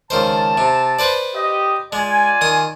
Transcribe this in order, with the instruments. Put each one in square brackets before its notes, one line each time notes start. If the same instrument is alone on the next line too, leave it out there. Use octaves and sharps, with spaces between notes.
[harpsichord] C#2 D#3 C5 [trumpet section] A5
[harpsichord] C3
B4 C5 D5
[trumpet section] G4 D#5
[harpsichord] G#3 [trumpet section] F4 D5 G#5
[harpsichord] D#3 D#6